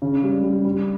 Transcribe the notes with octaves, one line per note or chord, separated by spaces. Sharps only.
C#3
G3
G3
G3